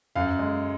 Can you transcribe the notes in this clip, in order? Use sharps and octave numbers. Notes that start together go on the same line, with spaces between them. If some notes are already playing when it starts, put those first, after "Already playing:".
F#2 F5
G#3